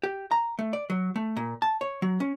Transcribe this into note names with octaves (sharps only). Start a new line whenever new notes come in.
G4
A#5
A3
D5
F#3
A3
A#2
A5
C#5
F#3
C#4